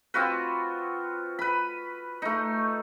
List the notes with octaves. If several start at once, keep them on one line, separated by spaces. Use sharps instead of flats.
C4 F4 F#4 B4
B4 B5
A3 D#4